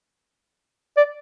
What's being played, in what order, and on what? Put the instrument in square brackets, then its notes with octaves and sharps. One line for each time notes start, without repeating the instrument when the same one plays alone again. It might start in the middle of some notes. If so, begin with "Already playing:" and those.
[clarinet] D5